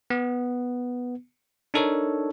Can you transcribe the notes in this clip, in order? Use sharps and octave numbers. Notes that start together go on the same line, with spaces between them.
B3
D4 D#4 A4 A#4 C#5